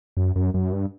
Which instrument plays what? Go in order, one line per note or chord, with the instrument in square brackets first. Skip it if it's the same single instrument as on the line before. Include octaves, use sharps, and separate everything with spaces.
[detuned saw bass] F#2
F#2
F#2
G2